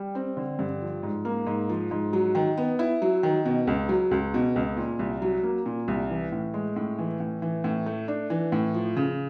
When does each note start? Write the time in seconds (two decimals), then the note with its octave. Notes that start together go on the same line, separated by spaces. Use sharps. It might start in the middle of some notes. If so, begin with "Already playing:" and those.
Already playing: G3
0.15 C4
0.37 D3
0.59 G2
0.81 F3
1.03 G#2
1.25 A#3
1.47 G#2
1.69 F3
1.91 G#2
2.13 F#3
2.35 D#3
2.57 B3
2.79 E4
3.02 F#3
3.23 D#3
3.45 B2
3.67 C#2
3.89 F#3
4.11 C#2
4.34 B2
4.56 C#2
4.77 A#2
4.99 C2
5.22 F#3
5.43 A#3
5.66 A#2
5.88 C2
6.10 E3
6.32 A2
6.54 G#3
6.76 A2
6.99 E3
7.20 A2
7.42 E3
7.64 A2
7.86 A3
8.08 D4
8.30 E3
8.52 A2
8.74 F3
8.96 C#3